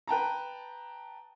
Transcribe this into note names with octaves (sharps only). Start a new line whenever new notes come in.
B4 G5 A5 A#5